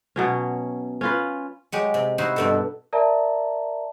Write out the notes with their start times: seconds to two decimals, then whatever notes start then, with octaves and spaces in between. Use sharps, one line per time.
0.16 B2 F#3 C#4
1.01 C#4 F4 B4
1.72 F#3 G#3 G4
1.94 C3
2.18 D#4 E4 F#4 C5 D#5
2.36 G2 B2 A4
2.93 A#4 D5 E5 A5 A#5